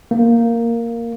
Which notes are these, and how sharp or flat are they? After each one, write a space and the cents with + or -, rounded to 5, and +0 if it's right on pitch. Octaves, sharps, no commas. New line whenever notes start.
A#3 -5